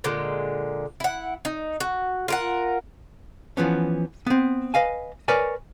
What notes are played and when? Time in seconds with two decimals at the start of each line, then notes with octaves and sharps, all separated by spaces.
0.04 A#2 D3 G#3
1.00 E4 F#5
1.45 D#4
1.80 F#4
2.28 F4 A#4 F#5
3.57 E3 F3 B3 C#4
4.27 B3 C4
4.74 B4 D#5 F5 G#5
5.28 A#4 B4 C#5 D5 G#5